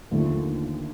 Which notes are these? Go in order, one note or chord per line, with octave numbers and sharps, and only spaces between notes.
D#2 D3 F3 A3